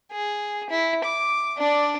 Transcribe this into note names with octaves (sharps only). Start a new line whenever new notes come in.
G#4
E4
D6
D4 D5